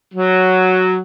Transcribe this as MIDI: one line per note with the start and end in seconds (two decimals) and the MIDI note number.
0.14 0.98 54